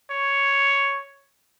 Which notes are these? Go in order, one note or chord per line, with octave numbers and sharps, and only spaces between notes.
C#5